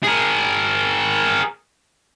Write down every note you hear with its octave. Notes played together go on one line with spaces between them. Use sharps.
G#4 A#4